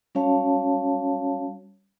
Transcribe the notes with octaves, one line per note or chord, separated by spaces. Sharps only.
G3 C#4 F#4 C#5 F5 A5